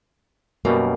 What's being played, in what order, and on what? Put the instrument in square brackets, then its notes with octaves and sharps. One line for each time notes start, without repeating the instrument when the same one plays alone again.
[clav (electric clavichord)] F#2 B2 G3 [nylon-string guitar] A#3